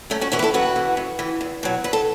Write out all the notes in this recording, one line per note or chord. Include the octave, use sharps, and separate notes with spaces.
F#2 A3 C#4
C#4 F#4
E3 C#4 F#4
B4
E4 A4
F#2 F#4 B4
E3
F#2
E3
E2
B2 F#3
E2 B4
A4